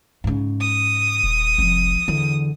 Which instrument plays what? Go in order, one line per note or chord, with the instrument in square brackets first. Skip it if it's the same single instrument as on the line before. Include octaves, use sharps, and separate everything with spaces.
[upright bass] G#2 C#3
[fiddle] D#6
[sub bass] D#1
[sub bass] F1 [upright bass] C2 F3
[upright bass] E2 [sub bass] D3